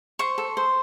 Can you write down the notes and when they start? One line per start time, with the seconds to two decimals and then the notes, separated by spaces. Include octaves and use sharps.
0.19 C5 C#6
0.38 A4
0.57 C5